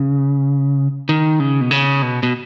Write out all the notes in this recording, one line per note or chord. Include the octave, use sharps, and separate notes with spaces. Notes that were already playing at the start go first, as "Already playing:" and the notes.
Already playing: C#3
D#3
C#3
B2
C#3
B2
B2